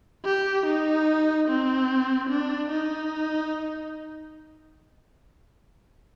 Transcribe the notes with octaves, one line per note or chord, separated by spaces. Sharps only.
G4
D#4
C4
D4
D#4